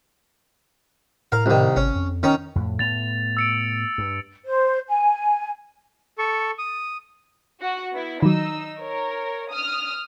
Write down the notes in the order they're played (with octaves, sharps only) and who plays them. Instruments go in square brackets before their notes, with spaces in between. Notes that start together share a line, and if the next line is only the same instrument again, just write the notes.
[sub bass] A2 [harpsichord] A#4 F5
[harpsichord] C2 D#3
[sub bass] G#1 [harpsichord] C#4
[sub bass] F2
[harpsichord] D#3 C#4 A#5
[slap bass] F2 A2
[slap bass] A2 B3 [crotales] A6 F7
[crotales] E6 C#7 D7
[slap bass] G2
[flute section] C5
G#5
[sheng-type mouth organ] A4 C#6
D#6
[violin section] F#4
B3 E4
[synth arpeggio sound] D#3 F#3 [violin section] D#4 E6
[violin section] A#4 C#5
D#6 F6